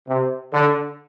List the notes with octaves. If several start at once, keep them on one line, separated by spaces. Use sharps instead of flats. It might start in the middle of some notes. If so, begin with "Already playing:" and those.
C3
D3